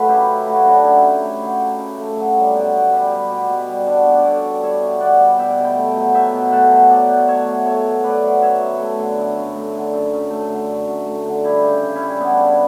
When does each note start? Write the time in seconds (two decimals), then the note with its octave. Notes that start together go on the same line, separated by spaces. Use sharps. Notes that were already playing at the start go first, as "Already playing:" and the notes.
Already playing: F#3 A3 B4 E5
0.08 C#3 E4 G4
0.28 C#3
0.46 A3 F#4
0.56 E4
0.65 F#3 D4 F#4
0.84 C#3 E4 G4
1.03 C#3
1.22 A3
1.41 F#3
1.60 C#3
1.79 C#3
1.98 A3
2.17 F#3
2.36 G3
2.55 B2
2.73 B2
2.92 G3
3.11 G3
3.31 B2
3.49 B2
3.68 G3
3.87 G3 D4 F#4
4.07 B2
4.15 D5
4.24 B2 A4 C#5
4.44 G3
4.62 G3 C#5 E5
4.82 B2
5.00 B2 D5 F#5
5.20 G3
5.39 B2 E5 G5
5.58 B2
5.64 G5 B5
5.77 A3
5.96 F#3
6.14 B2 E5 G5
6.33 B2
6.52 A3 F#5 A5
6.71 F#3
6.90 B2 D5 F#5
7.09 B2
7.27 A3 C#5 E5
7.47 F#3
7.65 B2 A4 C#5
7.85 B2
8.04 A3 B4 D5
8.23 F#3
8.41 F#2 C#5 E5
8.60 F#2
8.79 A3
8.98 D3
9.18 F#2
9.37 F#2
9.55 A3
9.74 D3
9.93 F#2
10.13 F#2
10.30 A3
10.50 D3
10.69 F#2
10.88 F#2
11.06 A3
11.26 D3
11.44 G3 E4 G4
11.63 C#3
11.82 C#3
11.95 C#4 E4
12.02 G3
12.20 G3 B3 D4
12.39 C#3